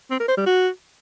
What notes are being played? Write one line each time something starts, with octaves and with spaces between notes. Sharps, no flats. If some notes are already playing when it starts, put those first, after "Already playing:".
C4
A#4
C5
G3
F#4